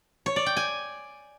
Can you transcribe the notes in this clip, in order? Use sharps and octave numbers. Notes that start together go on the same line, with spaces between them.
C#5
D5
G5
G#5